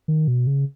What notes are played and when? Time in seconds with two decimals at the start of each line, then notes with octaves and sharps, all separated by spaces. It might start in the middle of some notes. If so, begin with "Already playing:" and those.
0.08 D#3
0.28 B2
0.47 C#3